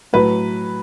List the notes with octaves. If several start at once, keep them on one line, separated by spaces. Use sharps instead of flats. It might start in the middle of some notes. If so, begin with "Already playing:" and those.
A2 F#3 B4